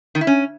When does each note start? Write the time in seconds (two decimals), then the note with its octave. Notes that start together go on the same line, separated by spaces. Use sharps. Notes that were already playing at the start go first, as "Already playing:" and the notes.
0.15 D#3
0.21 E4
0.27 C#4